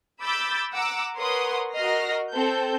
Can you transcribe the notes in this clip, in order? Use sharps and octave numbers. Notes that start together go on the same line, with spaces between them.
B5 D6 E6 G6 A6
F#5 A#5 D6 E6
A#4 B4 C#5 F#5 C6 D#6
F#4 A#4 D#5 F6 A#6 C7
C4 A4 G6